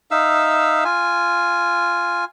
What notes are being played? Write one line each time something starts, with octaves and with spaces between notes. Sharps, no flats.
D#4 E5 F5 E6
F4 G#5